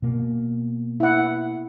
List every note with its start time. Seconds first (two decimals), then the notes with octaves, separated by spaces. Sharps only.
0.02 B2 A#3
1.00 E4 F#5